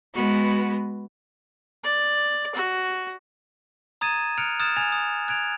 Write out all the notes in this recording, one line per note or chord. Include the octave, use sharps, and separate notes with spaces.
G#3 B3 F#4 B4
D5
F#4
A#5 D#6 G#6 A6 D#7 E7
F6 F#6 C#7 D7 F7
D#6 F6 F#6 G#6 A6 E7
G#5 G#6 A6 F7
D#6
F#6 G#6 D7 F7